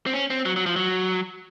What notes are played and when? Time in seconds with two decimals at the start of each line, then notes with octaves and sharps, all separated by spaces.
0.06 C4
0.14 C#4
0.30 C4
0.45 F#3
0.56 F#3
0.66 F3
0.76 F#3